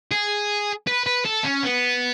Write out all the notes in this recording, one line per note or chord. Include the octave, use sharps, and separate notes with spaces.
G#4
B4
B4
A4
C#4
B3